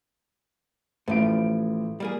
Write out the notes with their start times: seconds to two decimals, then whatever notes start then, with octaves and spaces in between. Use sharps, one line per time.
1.08 A1 A2 F3 D7
2.00 G3 A#3 G#4